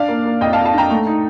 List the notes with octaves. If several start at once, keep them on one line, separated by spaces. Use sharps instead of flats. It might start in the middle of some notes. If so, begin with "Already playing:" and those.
Already playing: D4 D5 F5
A#3
A#3
F2 D#5 G5
F5 A5
F2
F5 A5
D4 G5 A#5
A3
D#4